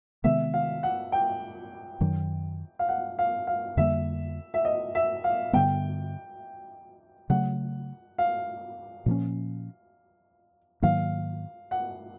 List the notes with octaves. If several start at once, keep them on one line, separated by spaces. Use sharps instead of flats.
C3 D#3 G#3 B3 E5
F5
F#5
G5
F#2 D#3 F#3
F5
F#5
F5
F5
F2 D3 G3 A#3 E5
E5
D#5
E5
F5
G2 D3 G3 B3 G5
C#3 F#3 A3 F#5
F5
A#2 F3 A#3 C#4
G#2 D#3 F#3 A#3 F5
F#5